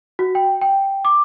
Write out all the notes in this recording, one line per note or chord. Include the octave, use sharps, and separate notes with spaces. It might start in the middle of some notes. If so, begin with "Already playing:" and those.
F#4
G5
G5
D6